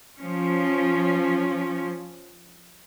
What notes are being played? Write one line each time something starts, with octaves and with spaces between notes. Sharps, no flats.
F3 C#4